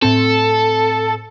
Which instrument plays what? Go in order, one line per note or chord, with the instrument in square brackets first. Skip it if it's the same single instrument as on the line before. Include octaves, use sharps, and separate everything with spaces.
[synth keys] A2 C4 [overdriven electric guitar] A4